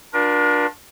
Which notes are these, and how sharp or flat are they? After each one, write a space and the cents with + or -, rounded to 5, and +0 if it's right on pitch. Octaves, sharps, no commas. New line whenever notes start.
D4 +5 F4 +45 A#4 +40